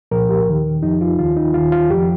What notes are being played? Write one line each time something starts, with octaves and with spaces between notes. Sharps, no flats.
C2 A#2 F3 A#4
G4
D#2 D#3
F2 F3 D#4
F4
D#2 D#3 F4
D#4
D#2 D#3 F4
F4
F2 F3 G4